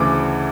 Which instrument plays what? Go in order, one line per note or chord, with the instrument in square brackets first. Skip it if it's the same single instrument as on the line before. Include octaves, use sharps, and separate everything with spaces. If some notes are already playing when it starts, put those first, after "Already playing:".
Already playing: [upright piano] D2 C#3 E3 D6